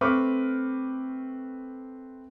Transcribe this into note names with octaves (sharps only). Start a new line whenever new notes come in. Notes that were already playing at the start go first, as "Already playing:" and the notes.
A3 C4 B4 C#6 D6 F6